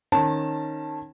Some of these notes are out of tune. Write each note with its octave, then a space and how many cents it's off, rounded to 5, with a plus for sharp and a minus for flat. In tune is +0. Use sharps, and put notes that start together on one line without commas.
D#3 -15 C#4 -25 A5 +0